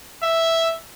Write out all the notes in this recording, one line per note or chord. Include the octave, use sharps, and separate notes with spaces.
E5